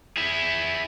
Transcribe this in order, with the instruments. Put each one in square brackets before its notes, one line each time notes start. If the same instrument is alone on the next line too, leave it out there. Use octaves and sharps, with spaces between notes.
[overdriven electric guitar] E4 G#4